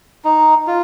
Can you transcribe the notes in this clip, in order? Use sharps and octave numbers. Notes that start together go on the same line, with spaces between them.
D#4
F4